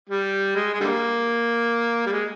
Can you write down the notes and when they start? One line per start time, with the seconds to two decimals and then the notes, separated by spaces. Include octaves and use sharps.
0.09 G3
0.56 G#3
0.74 G#3
0.80 D3 G3 A#3
2.06 G3
2.13 G#3